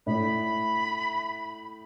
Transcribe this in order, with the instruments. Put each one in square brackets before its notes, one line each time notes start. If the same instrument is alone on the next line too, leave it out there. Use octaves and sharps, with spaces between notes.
[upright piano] A2 [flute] B5